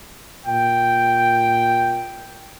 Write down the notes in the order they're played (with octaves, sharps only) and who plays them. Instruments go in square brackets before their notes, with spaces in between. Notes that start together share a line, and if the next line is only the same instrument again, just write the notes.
[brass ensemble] A#2 G5